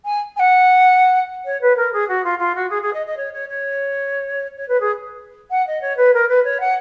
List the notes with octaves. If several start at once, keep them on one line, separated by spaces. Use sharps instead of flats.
G#5
G#5
F#5
C#5
B4
A#4
G#4
F#4
F4
F4
F#4
G#4
G#4
D#5
D#5
C#5
C#5
C#5
C#5
B4
G#4
F#5
D#5
C#5
B4
A#4
B4
C#5
F#5